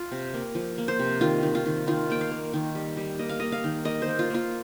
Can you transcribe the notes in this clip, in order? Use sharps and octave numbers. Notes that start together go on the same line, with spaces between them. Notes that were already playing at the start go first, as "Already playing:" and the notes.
Already playing: F4
C3
A#3
F3
A#3
C5
C3
D#3 F4
D#3
F4
D#3
D#3 F4
A#3 G5
F5
A#3
D#3
G3
G3
A#3 D#5
F5
A#3 D#5
F5
D#3
A#3 D#5
C5
A#3
F4
A#3 F4